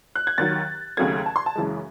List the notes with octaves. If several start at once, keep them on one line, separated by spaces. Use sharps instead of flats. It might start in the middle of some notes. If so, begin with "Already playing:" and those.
F#6
G#6
D#2 D#3 F#3 A6
D#2 C#3 F#3 A3 G#6
A5
C6
A5
F#2 C#3 E3 G#3